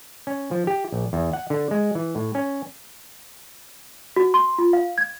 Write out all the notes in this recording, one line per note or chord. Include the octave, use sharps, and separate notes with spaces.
C#4
F3
G4
A#1
E2
F#5
D3
G#3
E3
A2
C#4
F#4
C6
F4
F5
G#6